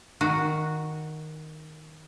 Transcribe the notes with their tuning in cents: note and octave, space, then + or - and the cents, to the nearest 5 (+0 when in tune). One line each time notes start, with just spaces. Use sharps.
D#3 +0 F#4 -5